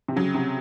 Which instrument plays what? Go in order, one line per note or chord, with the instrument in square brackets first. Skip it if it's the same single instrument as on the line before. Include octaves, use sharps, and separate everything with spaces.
[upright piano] C3
[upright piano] C#3 [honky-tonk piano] F#3
[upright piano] C3